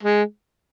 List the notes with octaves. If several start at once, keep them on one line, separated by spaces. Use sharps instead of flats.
G#3